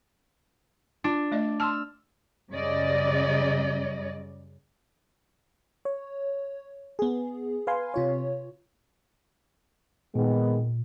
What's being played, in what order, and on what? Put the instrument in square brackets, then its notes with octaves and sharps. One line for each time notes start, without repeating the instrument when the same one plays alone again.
[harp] D4 [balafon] F4
[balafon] A3 D5 D#5
[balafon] A5 C6 [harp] E6 F6
[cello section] F#2 C#3 G3 D5 D#5
[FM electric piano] C#5
B3 G#4
B4 F5 G#5 C6
C3 F4 C#5
[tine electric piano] A#2 [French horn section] D#3 G#3 B3